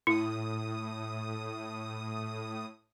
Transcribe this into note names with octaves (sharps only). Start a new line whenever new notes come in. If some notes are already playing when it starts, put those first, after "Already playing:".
A2 E4 D#6